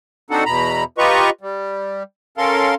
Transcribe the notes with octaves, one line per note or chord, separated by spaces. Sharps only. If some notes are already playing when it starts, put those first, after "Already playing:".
C4 D4 D#4 F#4 A4 F#5
E2 B2 A#5 B5
F4 G4 B4 D#5 A#5 C#6
G3
C#4 A4 A#4 F5 C6